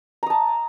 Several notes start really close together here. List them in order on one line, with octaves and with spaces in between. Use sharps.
A#5 D#6 A5